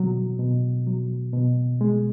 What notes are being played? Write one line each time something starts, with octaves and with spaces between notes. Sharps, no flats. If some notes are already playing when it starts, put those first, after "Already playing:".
Already playing: B2 F#3
B2
F#3
B2
G#3